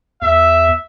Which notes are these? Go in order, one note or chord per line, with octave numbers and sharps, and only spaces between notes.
E2 E5